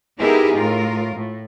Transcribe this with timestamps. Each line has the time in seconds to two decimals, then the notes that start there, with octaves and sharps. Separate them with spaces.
0.19 B3 D#4 E4 G4 G#4 A#4
0.56 A2 F4 A#4
1.16 A2